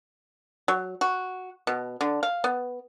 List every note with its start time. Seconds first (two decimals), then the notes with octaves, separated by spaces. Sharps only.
0.68 F#3
1.01 F#4
1.67 B2
2.01 D3
2.23 F5
2.44 B3